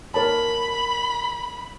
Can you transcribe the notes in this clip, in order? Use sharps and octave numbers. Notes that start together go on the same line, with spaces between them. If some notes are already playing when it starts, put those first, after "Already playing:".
A#4 C#5 A5 B5